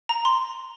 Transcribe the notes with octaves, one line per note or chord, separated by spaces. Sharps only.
A#5
C6